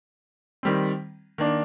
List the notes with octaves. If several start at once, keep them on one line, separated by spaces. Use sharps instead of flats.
D#3 G3 C4
D#3 A#3 D4